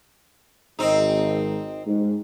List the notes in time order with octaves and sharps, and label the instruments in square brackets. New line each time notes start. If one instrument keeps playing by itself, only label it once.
[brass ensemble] G#1 [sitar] C4 D#4
[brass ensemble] G#2